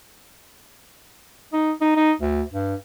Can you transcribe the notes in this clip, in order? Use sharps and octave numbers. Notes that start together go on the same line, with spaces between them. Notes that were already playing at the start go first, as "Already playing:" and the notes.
D#4
D#4
D#4
D2
G2